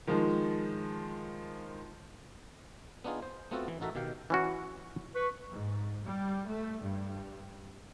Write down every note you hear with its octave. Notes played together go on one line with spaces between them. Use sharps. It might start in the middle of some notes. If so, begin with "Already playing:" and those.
D#3 F3 G#3
B3 D4 D#4 F4 G#4
C5
A3 B3 C4 F4 F#4 A4
E3
A1 D#4 F#4 A4 A#4 E5
B2 D#3 G4 F5 G5
E3 C#4 F#4
B4 C#6
G#2
G3
A3
G2